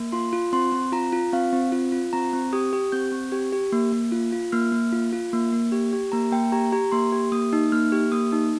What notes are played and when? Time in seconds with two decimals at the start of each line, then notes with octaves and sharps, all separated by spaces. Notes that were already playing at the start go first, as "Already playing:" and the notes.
Already playing: A#3
0.12 F4 C6
0.33 F4
0.53 C4 C6
0.72 C4
0.92 F4 A#5
1.12 F4
1.33 C4 F5
1.53 C4
1.72 F4
1.92 F4
2.13 C4 A#5
2.33 C4
2.53 G4 D#6
2.73 G4
2.92 C4 G6
3.12 C4
3.32 G4
3.53 G4
3.72 A#3
3.92 A#3
4.12 F4
4.33 F4
4.52 A#3 F6
4.72 A#3
4.92 F4
5.13 F4
5.33 A#3
5.52 A#3
5.72 G4
5.93 G4
6.12 A#3 A#5
6.32 A#3 G5
6.52 G4 A#5
6.72 G4 A#5
6.92 A#3 C6
7.12 G4
7.32 A#3 D#6
7.53 D#4
7.72 A#3 F6
7.92 G4
8.12 A#3 D#6
8.32 D#4